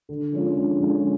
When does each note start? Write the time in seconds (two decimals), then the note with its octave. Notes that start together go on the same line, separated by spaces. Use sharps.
0.09 D3
0.33 F3 G#3 C#4 F4
0.57 D3
0.80 F3 G#3 C#4 F4